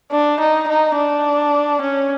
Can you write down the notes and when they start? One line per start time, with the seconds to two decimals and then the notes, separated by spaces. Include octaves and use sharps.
0.11 D4
0.40 D#4
0.68 D#4
0.96 D4
1.81 C#4